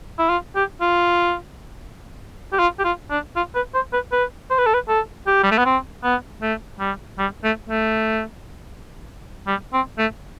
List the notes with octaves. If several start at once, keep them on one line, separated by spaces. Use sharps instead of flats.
E4
F4
G4
F4
G4
F4
G4
F4
D4
F4
B4
C5
B4
B4
C5
B4
A4
B4
A4
G4
G3
A3
B3
C4
B3
A3
G3
G3
A3
A3
G3
C4
A3